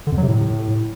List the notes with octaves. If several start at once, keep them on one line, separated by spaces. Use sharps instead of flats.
D3
F2
F#3
C3
A2